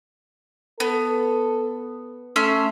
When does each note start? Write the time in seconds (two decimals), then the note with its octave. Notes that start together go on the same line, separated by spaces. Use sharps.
0.80 B3 A4
2.36 A3 C#4 E5 C6